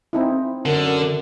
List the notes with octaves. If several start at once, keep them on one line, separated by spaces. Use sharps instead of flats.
C4 D#4 E4
F#2 D3 A#4